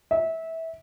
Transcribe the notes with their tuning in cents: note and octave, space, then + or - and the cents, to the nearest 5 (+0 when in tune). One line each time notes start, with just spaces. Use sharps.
E5 -20